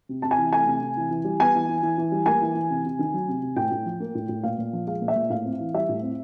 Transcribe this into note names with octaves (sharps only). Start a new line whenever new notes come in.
C3
C3 A5
G#5
E3
A3 G#5
C3
C3
E3
E3
G3
B3 G#5
E3
E3
E3
E3
G3
A#3 G#5
E3
E3
C3
C3
D#3
F#3
C3
C3
A2 G5
A2
F3
A#3
A2
A2
A#2 F5
A#2
F3
G#3 F5
A#2
E5
A#2
A2 F5
C4
E3
G3 E5
A2
C4